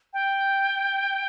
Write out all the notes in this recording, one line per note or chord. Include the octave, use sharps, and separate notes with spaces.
G5